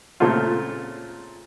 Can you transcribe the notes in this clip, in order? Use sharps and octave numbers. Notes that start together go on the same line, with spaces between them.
A#2 C#3 A3 C4 F4